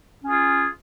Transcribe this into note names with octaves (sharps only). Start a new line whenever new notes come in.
C#4 F4 G#4